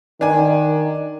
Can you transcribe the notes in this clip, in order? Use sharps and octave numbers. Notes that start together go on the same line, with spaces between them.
D#3 D4 G#5